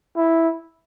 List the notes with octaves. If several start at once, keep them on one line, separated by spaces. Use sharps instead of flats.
E4